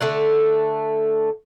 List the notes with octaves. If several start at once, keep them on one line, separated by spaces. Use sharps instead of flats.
D3 A3 F#5